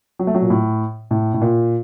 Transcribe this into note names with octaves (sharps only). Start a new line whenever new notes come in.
F#3
A3
F#3
A#2
A2
A2
A2
A#2